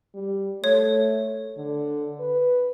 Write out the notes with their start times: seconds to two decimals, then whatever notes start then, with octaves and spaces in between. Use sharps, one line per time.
0.14 G3
0.64 A3 C#5
1.57 D3
2.20 B4